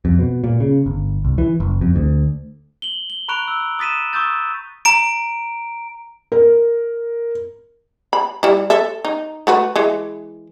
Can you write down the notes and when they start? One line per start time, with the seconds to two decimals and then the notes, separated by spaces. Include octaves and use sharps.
0.05 F2
0.19 B2
0.44 A#2
0.60 C#3
0.86 G1
1.25 C2
1.38 E3
1.60 F#1
1.81 F2
1.96 D2
2.82 F#7 G7
3.10 G7
3.28 A#5 B5 C#6 F#6 D7 F7
3.48 E6
3.79 D#6 A6 B6 D#7 E7
4.13 C#6 D#6 E6 G6 A6
4.85 A#5 D7
6.32 A#4
8.13 B5
8.43 G3 E4
8.70 A4 E5
9.05 D#4
9.47 A3 F#4 B4
9.76 E3 G#3